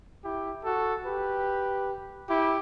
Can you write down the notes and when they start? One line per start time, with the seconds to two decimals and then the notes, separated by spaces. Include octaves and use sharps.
0.23 E4 G4
0.64 F#4 A4
1.06 G4 B4
2.29 E4 G4